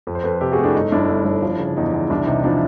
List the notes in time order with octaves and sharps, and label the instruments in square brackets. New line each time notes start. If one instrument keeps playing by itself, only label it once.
[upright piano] F2
C5
F2 A4 B4
C3 G4 A4
F#4 G#4
A3
D4 E4
G1 D#4
G1 D4 E4
G1
G1
F3
C#3
E2 D#4
E2
C2 D4
C3 D#4
F3 D4 E4